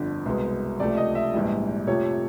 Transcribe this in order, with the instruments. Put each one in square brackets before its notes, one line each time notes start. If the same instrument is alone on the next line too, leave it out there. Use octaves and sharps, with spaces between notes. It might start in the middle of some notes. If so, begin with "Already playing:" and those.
Already playing: [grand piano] G1 F2 D3
C2 B2 G#3 B3
C#2 C3 F3 A3 D5
D#5
E5
A#1 G#2 E3 G3
F2 C3 F3 A3 C#5